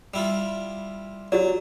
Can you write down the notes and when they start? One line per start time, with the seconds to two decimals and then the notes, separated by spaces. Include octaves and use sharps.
0.14 G3 E4 F4
1.32 F#3 F#4 G4 D5